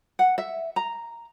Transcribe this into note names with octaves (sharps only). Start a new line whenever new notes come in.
F#5
E5
A#5